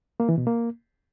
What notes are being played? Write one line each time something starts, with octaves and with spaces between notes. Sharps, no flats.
A#3
E3
B2
A#3